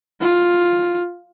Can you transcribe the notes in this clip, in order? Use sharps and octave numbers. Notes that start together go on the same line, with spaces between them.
F4